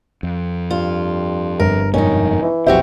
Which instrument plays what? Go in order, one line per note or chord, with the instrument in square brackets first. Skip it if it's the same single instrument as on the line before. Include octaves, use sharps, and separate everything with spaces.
[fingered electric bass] F2
[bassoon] G2 [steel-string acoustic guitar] F4
[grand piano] G1 [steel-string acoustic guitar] A#4
[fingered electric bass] F2 G#2 B2 [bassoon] D#3 [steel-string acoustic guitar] C#4 D#4
[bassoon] E3
[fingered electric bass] B1 F2 C3 [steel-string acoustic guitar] F#4 G4 C5 [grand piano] E5